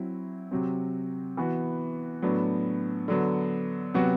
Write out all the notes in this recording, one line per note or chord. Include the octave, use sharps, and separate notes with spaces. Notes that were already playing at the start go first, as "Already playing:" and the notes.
Already playing: F#3 C4 E4
C3 F#3 C4
E3 B3 F#4
A2 F#3 B3 D4
D3 F#3 B3
C3 F#3 B3 F#4